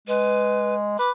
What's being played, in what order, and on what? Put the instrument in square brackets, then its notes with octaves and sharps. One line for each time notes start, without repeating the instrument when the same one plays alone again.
[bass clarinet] G#3 [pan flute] B4
[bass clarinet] B4 [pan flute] D6